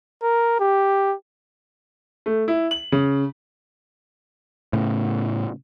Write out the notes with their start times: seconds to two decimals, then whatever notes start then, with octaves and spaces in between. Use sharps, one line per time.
0.22 A#4
0.60 G4
2.26 A3
2.48 E4
2.71 F#7
2.92 C#3
4.73 A2 C#3